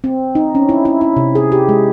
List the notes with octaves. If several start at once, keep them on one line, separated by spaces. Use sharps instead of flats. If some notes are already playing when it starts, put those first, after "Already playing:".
C4
D#4
C#4
E4
E4
E4
C3
G#4
G4
G#3